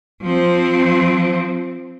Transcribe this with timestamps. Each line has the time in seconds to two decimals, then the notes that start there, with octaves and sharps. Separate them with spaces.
0.23 F3 C4